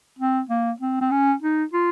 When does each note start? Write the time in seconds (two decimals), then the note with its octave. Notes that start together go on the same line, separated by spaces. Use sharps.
0.19 C4
0.49 A#3
0.80 C4
1.01 C4
1.11 C#4
1.42 D#4
1.73 F4